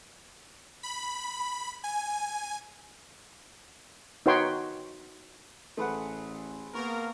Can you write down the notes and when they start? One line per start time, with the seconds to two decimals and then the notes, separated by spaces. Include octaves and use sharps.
0.83 B5
1.84 G#5
4.26 D#4 F#4 B4 C#5 G5 C6
5.77 A1 A3 G#4 B4 C5 F#5
6.74 A#3 B3 A#4 B4 A5 C#6